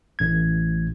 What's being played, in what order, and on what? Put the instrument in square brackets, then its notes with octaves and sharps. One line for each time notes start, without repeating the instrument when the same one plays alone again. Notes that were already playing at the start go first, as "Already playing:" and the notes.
[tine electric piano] A1 G#6